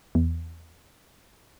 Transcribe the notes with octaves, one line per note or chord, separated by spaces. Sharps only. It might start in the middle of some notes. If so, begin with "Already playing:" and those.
E2